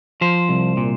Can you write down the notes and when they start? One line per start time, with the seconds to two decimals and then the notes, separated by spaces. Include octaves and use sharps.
0.21 F3 C5
0.49 C2
0.77 A#2